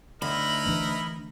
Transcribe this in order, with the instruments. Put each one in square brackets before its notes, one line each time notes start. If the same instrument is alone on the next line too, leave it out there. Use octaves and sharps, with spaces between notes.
[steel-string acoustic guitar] D2 [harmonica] D#4 E4 A#4 [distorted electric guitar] B5
[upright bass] E3 D4